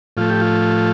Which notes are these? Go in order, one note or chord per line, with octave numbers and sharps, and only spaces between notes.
A2 F3 A3 F4
G4
F4